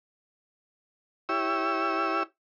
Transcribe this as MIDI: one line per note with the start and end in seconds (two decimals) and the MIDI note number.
1.29 2.23 64
1.29 2.23 67
1.29 2.23 73
1.29 2.23 88